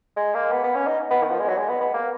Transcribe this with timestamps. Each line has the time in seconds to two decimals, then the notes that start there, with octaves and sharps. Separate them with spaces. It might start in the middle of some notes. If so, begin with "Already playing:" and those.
0.16 G#3
0.35 A#3
0.52 B3
0.64 B3
0.75 C#4
0.87 D#4
1.11 B3
1.23 D#3
1.31 F3
1.39 G#3
1.48 F#3
1.58 G#3
1.69 B3
1.81 B3
1.93 A#3